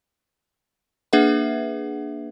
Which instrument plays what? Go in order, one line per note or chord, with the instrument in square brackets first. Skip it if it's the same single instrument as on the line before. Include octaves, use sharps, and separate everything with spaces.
[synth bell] A#3 D4 G#4 B4 E5 F#5